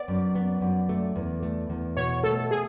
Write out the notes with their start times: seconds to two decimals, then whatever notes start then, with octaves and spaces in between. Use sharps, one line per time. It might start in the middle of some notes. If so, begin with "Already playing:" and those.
Already playing: B3 D5
0.08 F#2
0.35 B3
0.61 F#2
0.89 A3
1.16 E2
1.43 A3
1.70 E2
1.97 B2 C#5
2.23 A3 A4
2.51 G#4